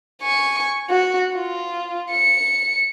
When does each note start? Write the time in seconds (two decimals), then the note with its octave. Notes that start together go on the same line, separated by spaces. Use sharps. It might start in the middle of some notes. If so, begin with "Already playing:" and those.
0.22 G#5 C#6
0.90 F#4
1.35 F4
2.11 C#7